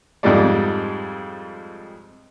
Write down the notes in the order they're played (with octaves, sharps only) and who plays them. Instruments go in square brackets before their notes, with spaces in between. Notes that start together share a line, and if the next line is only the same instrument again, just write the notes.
[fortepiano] F2 G#2 G3 G#3 D5